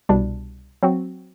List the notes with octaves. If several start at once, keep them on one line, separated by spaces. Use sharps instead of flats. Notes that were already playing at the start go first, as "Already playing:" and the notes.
C2 B2 G3 D4
F#3 C4 F#4